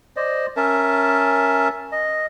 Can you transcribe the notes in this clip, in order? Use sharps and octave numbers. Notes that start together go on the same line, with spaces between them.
C5 D5 D#5
C#4 A#4 E5 A5
D#5